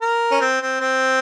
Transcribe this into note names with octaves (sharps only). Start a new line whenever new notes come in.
A#4
C#4
C4
C4
C4